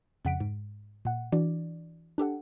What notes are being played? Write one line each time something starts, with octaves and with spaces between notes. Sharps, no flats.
F2 C#3 F#5 B6 D7
G#2
A#2 F#5
E3 D4 F#4 D5
D4 G4 A4 F#5